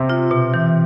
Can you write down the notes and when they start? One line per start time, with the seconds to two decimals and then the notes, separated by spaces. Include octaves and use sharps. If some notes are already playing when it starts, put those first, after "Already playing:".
Already playing: C3 C4
0.10 F4
0.31 B2
0.54 E3